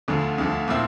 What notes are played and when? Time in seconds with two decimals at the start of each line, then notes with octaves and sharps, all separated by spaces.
0.08 D2 D3 F3
0.38 D2 D3 F3
0.68 A#2 F3 C4 E4